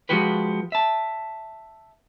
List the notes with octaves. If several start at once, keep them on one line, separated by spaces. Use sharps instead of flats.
F3 G3 G#3 F#4 G4 B4
E5 A5